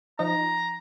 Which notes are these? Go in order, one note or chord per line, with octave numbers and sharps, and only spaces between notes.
F3 D#4 A#5